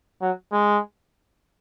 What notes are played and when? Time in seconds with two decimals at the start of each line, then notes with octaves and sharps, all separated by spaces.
0.22 F#3
0.52 G#3